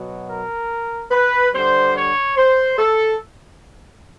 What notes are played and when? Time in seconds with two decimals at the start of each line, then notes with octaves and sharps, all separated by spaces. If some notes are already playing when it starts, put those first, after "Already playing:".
Already playing: B2 F#3
0.29 A#4
1.11 B4
1.53 D3 G3 C5
1.95 C#5
2.37 C5
2.78 A4